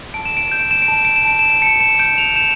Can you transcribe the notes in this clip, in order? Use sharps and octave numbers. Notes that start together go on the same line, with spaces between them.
A5 D7
E7
D7
G6 E7
D7
E7
D7
A5
E7
D7
E7
A5 D7
E7
D7
A5 C#7
E7
G6 D7
F7
G6 E7